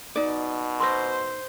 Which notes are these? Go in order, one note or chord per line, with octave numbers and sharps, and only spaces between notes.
B2 D#4 D5
C5 C6 E6 A#6